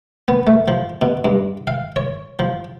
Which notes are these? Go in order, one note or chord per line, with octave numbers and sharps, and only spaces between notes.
B3
A3
F3
B2
G2
F5
C#5
F3